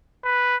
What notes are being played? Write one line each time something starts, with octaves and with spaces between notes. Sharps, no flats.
B4